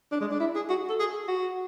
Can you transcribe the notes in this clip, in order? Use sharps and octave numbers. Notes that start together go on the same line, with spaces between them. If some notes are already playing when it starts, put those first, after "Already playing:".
D4
G#3
D4
E4
G#4
F#4
A4
G#4
F#4